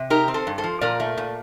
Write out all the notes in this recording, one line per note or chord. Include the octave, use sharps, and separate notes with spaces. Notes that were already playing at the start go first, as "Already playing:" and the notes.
Already playing: C3
D#4 G4 A#4
C4
A4 C5
G2
A4 C5
F3
A#2 A#4 D5
A3
A#2